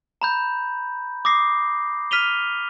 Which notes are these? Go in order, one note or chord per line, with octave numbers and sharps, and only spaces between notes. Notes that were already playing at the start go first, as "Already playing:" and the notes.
A#5 B5 G6
D6 D#6 A#6 C7
F6 B6 D#7 F7 G7